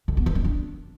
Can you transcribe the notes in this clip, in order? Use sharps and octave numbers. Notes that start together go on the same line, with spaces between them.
D3
B3
D#3
C#4
D4